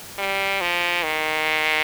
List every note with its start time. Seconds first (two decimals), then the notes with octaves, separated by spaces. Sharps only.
0.18 G3
0.61 F3
1.03 D#3